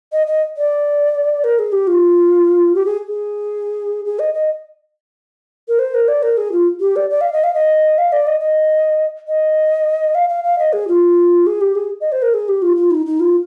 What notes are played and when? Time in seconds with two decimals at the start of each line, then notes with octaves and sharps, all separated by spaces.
0.12 D#5
0.27 D#5
0.57 D5
1.44 A#4
1.59 G#4
1.72 G4
1.87 F4
2.75 G4
2.85 G#4
3.07 G#4
4.05 G#4
4.19 D#5
4.34 D#5
5.68 A#4
5.79 C5
5.94 A#4
6.08 D5
6.22 A#4
6.37 G#4
6.52 F4
6.80 G4
6.96 D5
7.10 D5
7.21 F5
7.32 D#5
7.43 F5
7.54 D#5
7.98 F5
8.12 D5
8.27 D#5
8.40 D#5
9.28 D#5
10.14 F5
10.29 F5
10.44 F5
10.58 D#5
10.73 G#4
10.88 F4
11.46 G#4
11.61 G4
11.75 G#4
12.00 D#5
12.12 C5
12.22 A#4
12.34 G#4
12.48 G4
12.62 F4
12.76 F4
12.90 D#4
13.06 D#4
13.20 F4